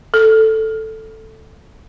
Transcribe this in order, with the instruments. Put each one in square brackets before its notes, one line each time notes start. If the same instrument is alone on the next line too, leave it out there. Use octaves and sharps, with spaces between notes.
[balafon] A4